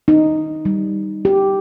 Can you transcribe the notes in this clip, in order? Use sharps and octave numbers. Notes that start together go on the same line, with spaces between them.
D#4
G3
G4